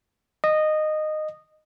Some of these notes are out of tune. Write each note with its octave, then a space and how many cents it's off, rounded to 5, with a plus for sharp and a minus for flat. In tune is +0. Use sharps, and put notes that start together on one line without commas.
D#5 -15